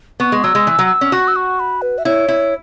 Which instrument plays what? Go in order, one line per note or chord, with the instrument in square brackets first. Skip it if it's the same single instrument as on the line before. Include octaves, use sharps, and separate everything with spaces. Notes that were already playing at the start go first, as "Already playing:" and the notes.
[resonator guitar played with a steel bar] B3 [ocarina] C#6
[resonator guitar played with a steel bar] G#3
[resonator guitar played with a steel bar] F#3 [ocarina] E6
[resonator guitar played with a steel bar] G#3
E3
F#3
C#4
[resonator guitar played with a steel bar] F#4 [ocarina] C#6
[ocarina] E6
C#6
B5
B4
E5
[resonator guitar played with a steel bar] E4 [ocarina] C#5
[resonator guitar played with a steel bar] E4